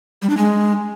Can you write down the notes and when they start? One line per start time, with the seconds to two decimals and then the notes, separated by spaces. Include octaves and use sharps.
0.22 G3
0.30 D4
0.37 G#3